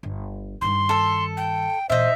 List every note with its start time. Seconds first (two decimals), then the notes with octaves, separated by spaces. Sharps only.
0.03 G1
0.61 G2 D#3 C6
0.89 A4 E6
1.37 G5
1.90 A#2 E3 D#4 C5 E5